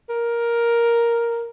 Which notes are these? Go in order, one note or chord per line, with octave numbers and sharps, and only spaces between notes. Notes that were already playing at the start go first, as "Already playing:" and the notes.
A#4